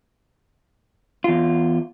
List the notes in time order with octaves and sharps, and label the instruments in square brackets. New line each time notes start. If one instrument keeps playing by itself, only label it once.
[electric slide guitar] E2 F4